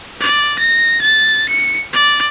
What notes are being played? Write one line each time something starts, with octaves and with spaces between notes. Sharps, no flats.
D5
A#6
A6
C#7
D5